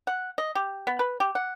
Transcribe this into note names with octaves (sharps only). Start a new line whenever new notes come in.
F#5
D#5
G4
B3
B4
G4
F#5